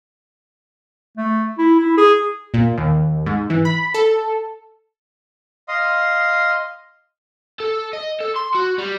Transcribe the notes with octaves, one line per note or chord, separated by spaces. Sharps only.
A3
E4
E4
G#4
A#2
D#2
G#2
E3
B5
A4
D#5 F5 C6 D#6
A4
D#5
A4
C6
F#4
G3